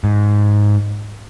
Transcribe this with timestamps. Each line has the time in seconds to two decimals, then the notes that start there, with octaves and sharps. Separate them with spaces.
0.04 G#2